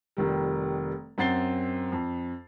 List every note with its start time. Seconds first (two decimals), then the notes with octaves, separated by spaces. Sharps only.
0.17 F1 D#3 G3
1.18 F#2 C4 F#5 A6 C7 G7
1.92 F2